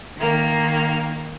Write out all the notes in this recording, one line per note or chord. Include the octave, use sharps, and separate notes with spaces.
D#3 A#3